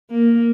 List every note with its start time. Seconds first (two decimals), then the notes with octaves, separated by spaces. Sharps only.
0.11 A#3